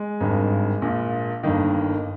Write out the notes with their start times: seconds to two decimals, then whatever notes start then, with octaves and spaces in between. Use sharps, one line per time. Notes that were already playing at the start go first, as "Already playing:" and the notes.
Already playing: G#3
0.20 G#1 G2 D#3
0.82 A#1 A#2
1.43 G1 G2 D#3 A#3